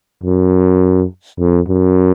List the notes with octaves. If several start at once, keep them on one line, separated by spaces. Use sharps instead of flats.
F#2
F2
F#2